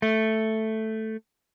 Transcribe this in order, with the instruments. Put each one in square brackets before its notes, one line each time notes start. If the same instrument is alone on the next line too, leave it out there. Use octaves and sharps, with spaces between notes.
[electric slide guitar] A3